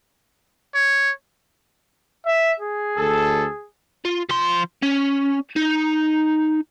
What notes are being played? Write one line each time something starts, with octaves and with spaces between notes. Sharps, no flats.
C#5
E5
G#4
D2 A4
F4
F3 C6
C#4
D#4